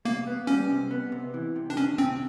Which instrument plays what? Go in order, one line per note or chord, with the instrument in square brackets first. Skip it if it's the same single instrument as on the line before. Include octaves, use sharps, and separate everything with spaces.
[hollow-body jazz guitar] C3 [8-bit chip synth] A#3
[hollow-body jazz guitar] B3
[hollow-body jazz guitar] G3 [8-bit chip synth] C#4
[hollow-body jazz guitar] C3
B3
C3
E3
C3
[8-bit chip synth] D4
[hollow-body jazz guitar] D#3 [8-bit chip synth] C#4
[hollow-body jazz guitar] C3 [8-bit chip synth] C4